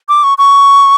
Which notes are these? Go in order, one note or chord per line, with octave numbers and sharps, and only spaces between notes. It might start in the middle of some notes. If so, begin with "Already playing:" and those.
D6
C#6
C#6